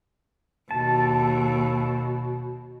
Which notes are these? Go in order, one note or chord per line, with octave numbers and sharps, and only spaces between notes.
D#2 B2 A5